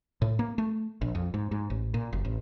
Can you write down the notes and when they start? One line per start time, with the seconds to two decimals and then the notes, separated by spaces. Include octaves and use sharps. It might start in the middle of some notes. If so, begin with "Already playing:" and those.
0.22 A2
0.39 A#3
0.58 A3
1.01 A#1
1.15 F2
1.34 G#2
1.51 G#2
1.70 A1
1.94 A#2
2.13 F#1
2.25 A1